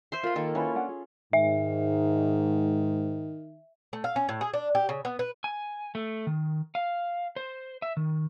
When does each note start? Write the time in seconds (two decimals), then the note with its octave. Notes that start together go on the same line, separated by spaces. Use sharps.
0.12 C5 E5 C6
0.23 F4 A#4 F5 B5
0.36 D#3 A#3 A4
0.55 C#4 E4 B4 B5
0.75 D4 F4 F#5
0.89 G#4
1.33 G#2 D#3 E5
3.93 A3
4.04 F5
4.16 C#4
4.29 A2
4.41 G#4
4.54 D4
4.75 G4
4.89 C#3
5.05 B3
5.19 B4
5.44 G#5
5.95 A3
6.27 D#3
6.75 F5
7.36 C5
7.82 E5
7.97 D#3